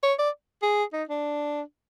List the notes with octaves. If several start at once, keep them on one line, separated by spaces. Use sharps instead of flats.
C#5
D5
G#4
D#4
D4